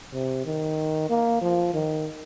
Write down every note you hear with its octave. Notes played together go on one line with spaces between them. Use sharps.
C3
D#3
A#3
F3
D#3